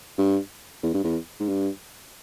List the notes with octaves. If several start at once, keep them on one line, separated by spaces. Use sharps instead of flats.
G2
E2
G2
E2
G#2
G2